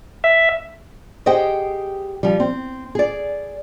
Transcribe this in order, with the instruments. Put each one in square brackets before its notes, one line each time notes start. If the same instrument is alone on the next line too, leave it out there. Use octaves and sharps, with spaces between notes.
[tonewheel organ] E5
[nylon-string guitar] G4 G#4 C5 D#5 F#5 G5
F3 G3
C4
G#4 D5